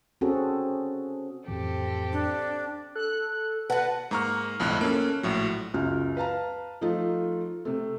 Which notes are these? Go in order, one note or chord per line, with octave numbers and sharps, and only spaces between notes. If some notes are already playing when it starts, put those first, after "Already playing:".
C4 C#4 F#4 G#4 A4
F2 A2 E3 C4 G4 A4
D4
A4 F#6
F#4 B4 F#5 A5
G#2 A#3 A#5 C#6 F6
B1 F2 A2 D3 F#6
A#3 C#4 A4
A#1 A2 F#3
C#2 F#2 F6
B4 F5 A5 A#5
F3 A3 D#4 F4
C3 A3